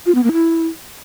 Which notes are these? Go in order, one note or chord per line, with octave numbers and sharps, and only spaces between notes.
F4
B3
A#3
E4